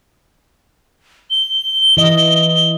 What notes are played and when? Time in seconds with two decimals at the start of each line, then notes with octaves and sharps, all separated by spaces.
1.30 G7
1.97 E3 D#5